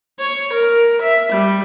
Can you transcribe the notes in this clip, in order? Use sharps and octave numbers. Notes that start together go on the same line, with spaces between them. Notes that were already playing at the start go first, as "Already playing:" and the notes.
C#5
A#4
E5
G3